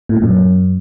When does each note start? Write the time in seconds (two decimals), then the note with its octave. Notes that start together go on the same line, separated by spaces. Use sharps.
0.09 A2
0.16 A#2
0.22 F#2